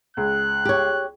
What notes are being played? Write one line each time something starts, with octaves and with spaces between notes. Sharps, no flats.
C#2 F#6
G4 C#5